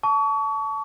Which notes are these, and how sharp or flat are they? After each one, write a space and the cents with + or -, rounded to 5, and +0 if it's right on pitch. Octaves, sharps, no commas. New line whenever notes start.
A5 -5 C#6 +35